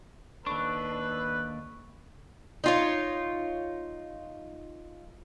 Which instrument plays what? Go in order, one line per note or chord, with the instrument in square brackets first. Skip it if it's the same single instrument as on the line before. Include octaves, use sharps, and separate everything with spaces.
[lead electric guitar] D#2 D4 [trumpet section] A4 B4 [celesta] C#6
[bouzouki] D#4 F4 C#5